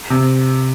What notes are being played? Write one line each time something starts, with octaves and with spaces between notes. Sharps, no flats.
C3